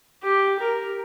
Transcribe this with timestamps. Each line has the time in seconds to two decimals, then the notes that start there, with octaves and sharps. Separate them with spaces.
0.23 G4
0.59 A#4